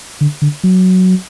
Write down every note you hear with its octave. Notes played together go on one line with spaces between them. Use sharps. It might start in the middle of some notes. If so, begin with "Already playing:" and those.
D3
D3
F#3